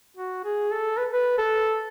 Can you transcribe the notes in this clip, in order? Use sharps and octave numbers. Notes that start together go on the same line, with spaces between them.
F#4
G#4
A4
B4
B4
A4